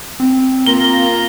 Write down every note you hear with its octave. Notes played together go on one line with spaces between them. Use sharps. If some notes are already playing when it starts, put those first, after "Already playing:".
C4
A#3 F4 A#5 G7